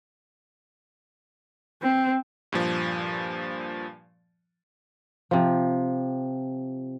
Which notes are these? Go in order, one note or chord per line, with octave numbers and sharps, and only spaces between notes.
C4
G2 A#2 F3
C3 F3